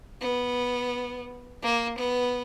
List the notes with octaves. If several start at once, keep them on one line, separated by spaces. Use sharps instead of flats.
B3
A#3
B3